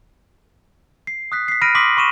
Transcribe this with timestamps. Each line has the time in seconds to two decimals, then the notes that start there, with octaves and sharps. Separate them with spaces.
1.07 C7
1.32 D#6 F#6 B6
1.48 B6 C7
1.61 B5 F6 A#6 D7 D#7
1.75 C6 D6 D#6 B6 F#7
1.97 B5 C#6 D#7 E7